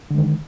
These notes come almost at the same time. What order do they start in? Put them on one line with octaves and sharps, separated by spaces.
D3 G#3 D#3